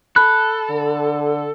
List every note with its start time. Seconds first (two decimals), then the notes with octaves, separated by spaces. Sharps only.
0.16 A4 B5 F#6
0.70 D3